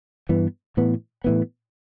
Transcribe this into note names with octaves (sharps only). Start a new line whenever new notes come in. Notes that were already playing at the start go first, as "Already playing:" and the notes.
G2 E3 B3
A2 E3 B3
A2 E3 B3